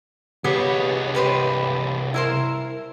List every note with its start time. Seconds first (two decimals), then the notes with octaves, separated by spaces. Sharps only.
0.44 C2 B3 G4 G#4 C#5
1.15 G4 B4 C5
2.14 E4 A#4 C5